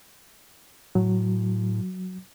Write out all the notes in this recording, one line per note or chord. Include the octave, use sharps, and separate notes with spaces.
A2 F#3